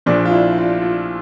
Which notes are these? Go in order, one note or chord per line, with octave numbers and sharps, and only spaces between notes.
A#1 A#2 F3 D4
F4
E4
F4
F4